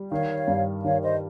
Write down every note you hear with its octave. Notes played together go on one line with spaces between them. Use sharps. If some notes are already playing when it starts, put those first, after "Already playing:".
Already playing: G3
D#3 C#5 F5
G2
D#3 C#5 F5
C5 D#5